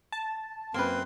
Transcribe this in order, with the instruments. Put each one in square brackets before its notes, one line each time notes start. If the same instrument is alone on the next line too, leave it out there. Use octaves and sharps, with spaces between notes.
[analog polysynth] A5
[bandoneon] F#2 C4 C6 [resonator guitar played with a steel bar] A#3 B4